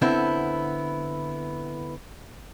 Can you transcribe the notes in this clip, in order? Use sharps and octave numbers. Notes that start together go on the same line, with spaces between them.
D3 B3 C4 E4